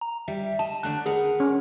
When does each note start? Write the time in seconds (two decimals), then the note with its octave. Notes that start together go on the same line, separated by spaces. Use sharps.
0.01 A#5
0.28 G3 E5
0.59 D#5 A5
0.83 D3 A3 D4 F#6
1.06 G#4 A#4 B4 F#5
1.40 C#4